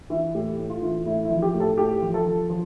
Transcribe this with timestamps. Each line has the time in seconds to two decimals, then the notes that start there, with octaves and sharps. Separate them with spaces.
0.10 E3
0.35 A2 G4
0.58 A2
0.70 F4
0.82 E3
1.06 A2 E4
1.25 E4
1.30 F3
1.42 G4
1.54 A2
1.60 A4
1.78 A2 G4
2.02 F3
2.14 A4
2.25 F3
2.50 F3